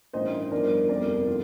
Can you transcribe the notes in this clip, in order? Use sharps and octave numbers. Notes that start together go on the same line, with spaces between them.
A1 G2 D#3 C5 D#5
G1 G2 F3 A#4 D5
G1 F2 C3 D#3 A#4 D5
D3 F3